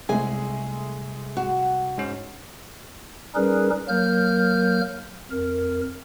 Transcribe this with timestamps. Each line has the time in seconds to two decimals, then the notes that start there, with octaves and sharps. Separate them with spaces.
0.09 C2 G#3 A3 G#4 G#5
1.37 F#4
1.98 G#2 C#4
3.35 G3 C#4 D#4 G#4 A#4 B4
3.88 F#3 A#3 A#4 F6 G6
5.31 F2 A#4